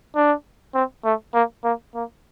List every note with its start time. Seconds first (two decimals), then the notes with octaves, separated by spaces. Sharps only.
0.15 D4
0.74 C4
1.05 A3
1.34 A#3
1.64 A#3
1.95 A#3